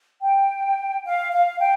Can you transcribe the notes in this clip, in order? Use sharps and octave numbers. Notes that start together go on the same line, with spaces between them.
G5
F5
F5
G5